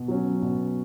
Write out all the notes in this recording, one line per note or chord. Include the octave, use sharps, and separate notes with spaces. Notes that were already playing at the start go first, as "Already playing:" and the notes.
Already playing: B2
F#3 C#4
B2